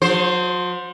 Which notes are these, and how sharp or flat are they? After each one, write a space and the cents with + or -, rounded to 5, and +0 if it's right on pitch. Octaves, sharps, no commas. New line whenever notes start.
F#3 -45 C5 +0